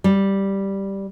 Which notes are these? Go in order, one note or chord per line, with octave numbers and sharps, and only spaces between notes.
G3